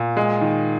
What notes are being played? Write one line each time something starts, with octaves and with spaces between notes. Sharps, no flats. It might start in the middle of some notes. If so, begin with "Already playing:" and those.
Already playing: A#2
G#3
D#3